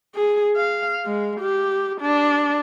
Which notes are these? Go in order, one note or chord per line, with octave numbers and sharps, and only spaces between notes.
G#4
F5
G#3
G4
D4